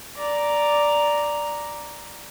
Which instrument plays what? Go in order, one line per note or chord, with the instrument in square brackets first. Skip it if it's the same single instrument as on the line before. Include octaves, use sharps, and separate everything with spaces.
[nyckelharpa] D5 A#5